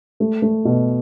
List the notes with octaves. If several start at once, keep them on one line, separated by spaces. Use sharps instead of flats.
A3
A3
B2